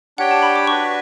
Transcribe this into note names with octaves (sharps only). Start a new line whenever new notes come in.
D4 G4 C#5 F#5 G5
A5
B5
D6
D4 F#4 B4 C#6